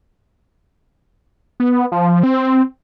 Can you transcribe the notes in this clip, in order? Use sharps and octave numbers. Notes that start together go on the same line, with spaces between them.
B3
F3
C4